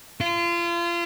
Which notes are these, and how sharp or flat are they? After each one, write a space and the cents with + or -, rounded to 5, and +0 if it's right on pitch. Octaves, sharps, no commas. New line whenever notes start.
F4 -30